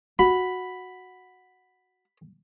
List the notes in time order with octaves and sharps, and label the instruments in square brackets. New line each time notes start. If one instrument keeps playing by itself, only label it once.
[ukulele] F#4 [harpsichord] B5